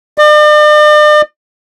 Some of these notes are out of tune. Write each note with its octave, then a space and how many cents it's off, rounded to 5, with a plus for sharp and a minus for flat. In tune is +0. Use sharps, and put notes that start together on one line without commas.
D5 +40